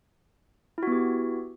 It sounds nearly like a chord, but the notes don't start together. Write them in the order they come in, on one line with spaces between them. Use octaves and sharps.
E4 F#4 B3 G4